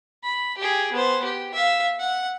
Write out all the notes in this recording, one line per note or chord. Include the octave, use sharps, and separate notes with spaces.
B5
G4 G#4
B3 C5
G4
E5 F5
F#5